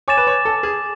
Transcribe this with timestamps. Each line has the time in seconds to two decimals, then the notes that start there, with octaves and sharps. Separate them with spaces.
0.08 C#5 G#5 D6 A6 E7
0.17 B4
0.27 C#5
0.45 A4
0.63 G#4